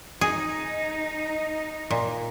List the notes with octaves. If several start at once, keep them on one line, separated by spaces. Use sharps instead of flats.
D#4 G#4
A#2